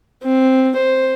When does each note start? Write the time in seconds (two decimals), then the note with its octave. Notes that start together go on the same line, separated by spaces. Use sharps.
0.23 C4
0.76 C5